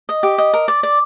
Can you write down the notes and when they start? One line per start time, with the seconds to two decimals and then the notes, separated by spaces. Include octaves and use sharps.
0.09 D#5
0.23 G4
0.38 D#5
0.53 A#4
0.68 D5
0.83 D5